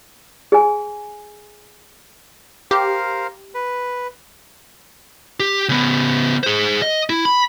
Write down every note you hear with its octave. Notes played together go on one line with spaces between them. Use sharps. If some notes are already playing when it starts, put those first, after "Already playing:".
G#4 G#5
G4 A#4 C5 F5
B4
G4
C#3 B3
G#4 C5
D#5
E4
B5